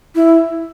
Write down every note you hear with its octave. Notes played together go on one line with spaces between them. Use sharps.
E4